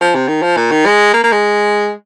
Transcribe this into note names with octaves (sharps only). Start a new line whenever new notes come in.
F3
C3
D#3
F3
A#2
D#3
G#3
A#3
A#3
G#3